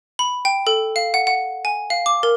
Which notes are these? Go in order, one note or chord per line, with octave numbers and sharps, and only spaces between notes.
B5
G5
A4
F5
F#5
F#5
G#5
F5
D6
A#4